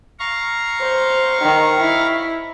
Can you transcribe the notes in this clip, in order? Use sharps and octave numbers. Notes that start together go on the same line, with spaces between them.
F5 A#5 C#6
C5
D#3
E4